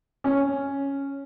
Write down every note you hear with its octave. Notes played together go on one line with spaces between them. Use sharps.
C#4